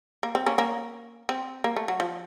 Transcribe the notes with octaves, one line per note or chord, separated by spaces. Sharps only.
A#3
C4
A#3 C#4
A#3 C#4
C4
A#3
A3
F#3
F3